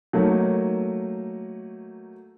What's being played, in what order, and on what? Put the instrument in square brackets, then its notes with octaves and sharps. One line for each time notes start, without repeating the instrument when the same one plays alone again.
[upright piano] F#3 A3 A#3 D#4